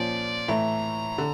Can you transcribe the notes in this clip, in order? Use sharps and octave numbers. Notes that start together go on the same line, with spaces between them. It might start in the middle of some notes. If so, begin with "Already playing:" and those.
Already playing: A#2 F3 C#4 D5
A2 E3 A3 E4 A#5
D3